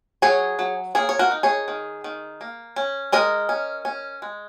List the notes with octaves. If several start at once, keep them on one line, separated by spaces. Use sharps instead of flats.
F#3 G#4 C#5
F#3
A#3 G#4 C#5
C#5
F#4 A#4
D#4
G#4 C#5
D#3
D#3
A#3
C#4
G#3 A#4 D#5
C#4
C#4
G#3